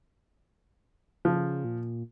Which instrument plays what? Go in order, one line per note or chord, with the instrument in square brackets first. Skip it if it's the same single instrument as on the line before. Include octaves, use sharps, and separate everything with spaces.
[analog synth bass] C#3 [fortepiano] F3
[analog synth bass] A#2